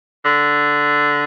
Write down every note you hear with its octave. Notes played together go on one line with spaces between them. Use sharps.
D3